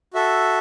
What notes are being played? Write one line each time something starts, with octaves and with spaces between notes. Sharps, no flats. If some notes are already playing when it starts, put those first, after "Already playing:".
F#4 A4 E5